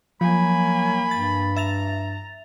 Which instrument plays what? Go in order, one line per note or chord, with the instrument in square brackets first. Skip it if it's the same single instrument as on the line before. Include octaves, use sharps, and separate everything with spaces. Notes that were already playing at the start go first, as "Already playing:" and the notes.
[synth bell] F3 [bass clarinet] F#3 [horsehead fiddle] A#3 G#5 [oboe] B5
[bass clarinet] G2 [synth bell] A6
[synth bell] E5 A6 F7 [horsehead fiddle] A#5